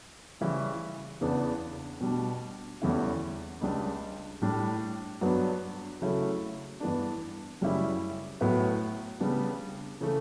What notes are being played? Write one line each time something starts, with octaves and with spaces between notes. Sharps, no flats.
C#3 E3 G3 C#4 E4
E2 C#3 E3 B3 D4
B2 G3 D4
E2 D3 G3 C#4 E4
C#2 C#3 G3 D4
A2 G3 D4
G2 F#3 B3 D4
C#3 F#3 A3 C#4 E4
G2 E3 B3 D4
F#2 C#3 G3 C#4 E4
A2 F#3 B3 E4
C#3 G3 B3 D4
C#3 E3 A3